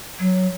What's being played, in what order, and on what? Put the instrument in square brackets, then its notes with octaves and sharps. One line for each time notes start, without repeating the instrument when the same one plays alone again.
[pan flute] F#3